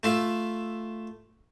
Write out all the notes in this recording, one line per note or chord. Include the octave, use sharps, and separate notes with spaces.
A3 F4 E5